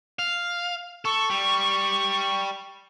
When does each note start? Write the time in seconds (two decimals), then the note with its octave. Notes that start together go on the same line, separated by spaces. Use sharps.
0.19 F5
1.05 A4 C#6
1.30 G3